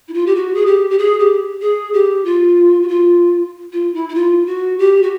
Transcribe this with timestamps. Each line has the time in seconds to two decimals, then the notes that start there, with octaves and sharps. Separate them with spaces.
0.08 E4
0.14 F4
0.26 G4
0.35 F#4
0.55 G#4
0.66 G4
0.90 G4
0.98 G#4
1.19 G4
1.61 G#4
1.94 G4
2.25 F4
2.82 F#4
2.88 F4
3.73 F4
3.94 E4
4.09 E4
4.15 F4
4.46 F#4
4.79 G4
5.03 F#4